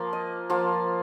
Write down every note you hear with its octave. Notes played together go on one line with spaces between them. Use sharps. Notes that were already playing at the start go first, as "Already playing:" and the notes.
Already playing: F3 A#3 F4
D#5
F3 A#3 F4